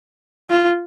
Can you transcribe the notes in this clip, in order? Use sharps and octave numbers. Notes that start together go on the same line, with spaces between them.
F4